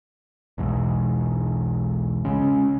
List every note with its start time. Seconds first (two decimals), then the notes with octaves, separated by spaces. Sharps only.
0.58 B1 E2 G#2
2.25 C#3 G#3 C#4